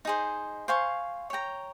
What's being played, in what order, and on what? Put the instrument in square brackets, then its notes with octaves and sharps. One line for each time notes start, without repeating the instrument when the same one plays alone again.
[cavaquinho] D#4 G#4 C5
C5 F5 G#5 C#6
C#5 G5 A#5